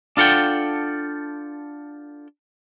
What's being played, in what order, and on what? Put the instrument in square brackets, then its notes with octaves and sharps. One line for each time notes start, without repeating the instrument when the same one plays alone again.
[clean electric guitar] D4 F4 A4 F#5 G5